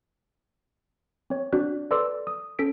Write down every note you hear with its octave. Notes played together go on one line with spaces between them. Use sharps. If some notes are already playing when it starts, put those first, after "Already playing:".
C4 C#5
C4 D4 F#4 D5 F#6
A4 B4 D5 C6 D6 E6
D#6
C#4 A4 B6 D7